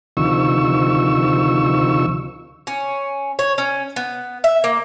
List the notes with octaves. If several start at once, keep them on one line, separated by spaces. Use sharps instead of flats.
D2 C3 D#3 F3 C#6 E6
C#4
C#5
C#4
B3
E5
A#3